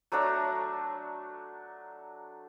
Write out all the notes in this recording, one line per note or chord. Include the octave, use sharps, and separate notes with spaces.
F#3 A3 D4 A#5